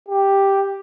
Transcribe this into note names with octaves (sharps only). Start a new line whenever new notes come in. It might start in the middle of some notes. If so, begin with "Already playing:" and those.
G4